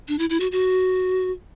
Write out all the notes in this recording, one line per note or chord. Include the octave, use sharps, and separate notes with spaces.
D4
E4
E4
F#4
F#4